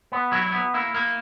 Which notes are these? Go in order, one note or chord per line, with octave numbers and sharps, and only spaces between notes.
B3
F#3 E4
B3
A#3 E4
A#3